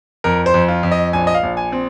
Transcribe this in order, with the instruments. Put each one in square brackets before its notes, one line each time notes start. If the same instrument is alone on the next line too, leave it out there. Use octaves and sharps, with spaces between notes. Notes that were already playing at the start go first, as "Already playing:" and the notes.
[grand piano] F2 A#4
C5
F2
F4
F2
D#5
A#1 G#5
D#5
F5
A#1
G#5
C4